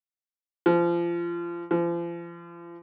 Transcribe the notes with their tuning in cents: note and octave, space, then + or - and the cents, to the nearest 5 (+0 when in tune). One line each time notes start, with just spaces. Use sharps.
F3 -30
F3 -40